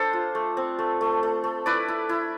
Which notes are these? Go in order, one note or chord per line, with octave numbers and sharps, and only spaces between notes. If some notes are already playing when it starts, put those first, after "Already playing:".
Already playing: D4 A4 C5
F4
A3
C4
A3
A3
A3
A3
E4 B4 D5
E4
E4